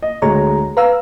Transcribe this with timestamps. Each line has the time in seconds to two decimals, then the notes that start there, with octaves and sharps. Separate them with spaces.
0.03 D#5
0.22 D2 G#3 C#5 A#5
0.77 B4 F5 A#5 E6